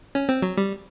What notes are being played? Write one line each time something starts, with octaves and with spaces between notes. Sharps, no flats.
C#4
C4
F#3
G3